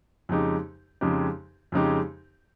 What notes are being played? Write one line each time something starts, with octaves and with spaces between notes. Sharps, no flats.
F2 C#3 G#3 D#4 G4
F2 C#3 G#3 D#4 G4
F2 C#3 G#3 D#4 G4